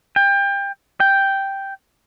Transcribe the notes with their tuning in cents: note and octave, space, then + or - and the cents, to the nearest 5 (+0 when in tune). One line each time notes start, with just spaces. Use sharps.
G5 +25
G5 +0